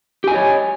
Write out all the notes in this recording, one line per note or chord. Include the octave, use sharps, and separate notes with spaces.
G4 C#5 D#5 G#5